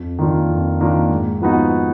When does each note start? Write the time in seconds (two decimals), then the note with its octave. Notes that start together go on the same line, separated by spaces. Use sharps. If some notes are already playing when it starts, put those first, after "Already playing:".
Already playing: F2
0.19 D#3 A#3 D4 F4
0.49 F2
0.81 D#3 A#3 D4 F4
1.11 G#2
1.42 F3 B3 D#4 F#4